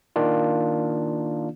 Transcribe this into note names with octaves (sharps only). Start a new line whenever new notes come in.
D#3 A#3 D4 F4